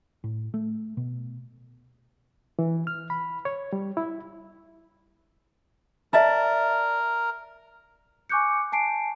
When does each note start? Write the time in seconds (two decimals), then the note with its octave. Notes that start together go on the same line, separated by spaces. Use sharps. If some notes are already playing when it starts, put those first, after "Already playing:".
0.24 A2
0.54 A3
0.97 B2
2.59 E3
2.87 F6
3.10 B5
3.45 C#5
3.73 G3
3.97 E4
6.13 A#4 D5 E5 A5
8.29 G#5 C#6 D6 F#6 G6 C#7
8.72 G#5 A5 C7 D7